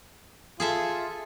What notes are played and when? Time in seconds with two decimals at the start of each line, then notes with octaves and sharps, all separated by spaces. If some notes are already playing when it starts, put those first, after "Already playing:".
0.60 F4 G#4 A4 E5